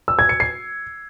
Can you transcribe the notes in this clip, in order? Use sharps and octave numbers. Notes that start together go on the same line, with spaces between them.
E6
G#6
C#7
C7